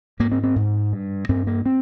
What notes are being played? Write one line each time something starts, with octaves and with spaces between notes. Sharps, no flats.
G#2 A#3
C4
C4
G#2
G2
G2 C4
A#3
C4